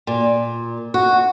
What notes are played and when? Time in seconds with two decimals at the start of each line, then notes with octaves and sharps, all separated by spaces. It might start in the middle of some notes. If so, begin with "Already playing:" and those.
0.07 A#2
0.94 F#4